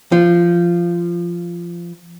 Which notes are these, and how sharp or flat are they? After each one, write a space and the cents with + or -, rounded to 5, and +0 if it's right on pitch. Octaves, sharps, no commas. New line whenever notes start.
F3 -15